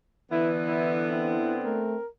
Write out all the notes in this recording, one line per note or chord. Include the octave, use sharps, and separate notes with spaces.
D3 E3 B3 E4
E4
C4 E4
A3 A#4